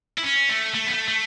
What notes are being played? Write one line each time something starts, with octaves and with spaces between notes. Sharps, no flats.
E4
C#4
A3
A3
B3
A3
A3